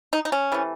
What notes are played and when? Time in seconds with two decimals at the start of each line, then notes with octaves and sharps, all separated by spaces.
0.13 D#4
0.25 D#4
0.32 C#4
0.52 C3 E3 A3